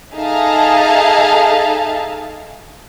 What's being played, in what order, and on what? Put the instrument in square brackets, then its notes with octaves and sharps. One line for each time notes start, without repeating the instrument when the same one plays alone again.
[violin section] D#4 G#4 A4 E5 F5 A5